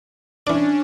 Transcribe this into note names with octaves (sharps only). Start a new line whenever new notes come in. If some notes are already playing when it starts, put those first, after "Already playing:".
E3 C#4 D4 D5